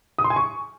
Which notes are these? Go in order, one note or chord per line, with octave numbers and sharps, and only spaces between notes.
D#6
C6
G#5
C#6